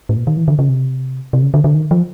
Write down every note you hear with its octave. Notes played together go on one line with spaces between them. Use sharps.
A2
A#2
D#3
E3
D3
C#3
C3
C3
C#3
D3
D3
D#3
F3